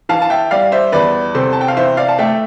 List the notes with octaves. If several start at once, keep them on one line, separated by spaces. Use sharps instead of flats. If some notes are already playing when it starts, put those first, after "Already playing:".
E3 F5 A5
A5
E5 G5
G3 D5 F5
C5 E5
E2 B4 D5
C3 A4 C5
A5
G5
F5
E3 C5 E5
D5 F5
A5
A3 E5 G5